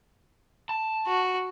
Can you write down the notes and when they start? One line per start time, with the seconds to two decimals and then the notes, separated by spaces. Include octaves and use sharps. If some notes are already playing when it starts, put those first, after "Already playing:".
0.69 A5
1.07 F#4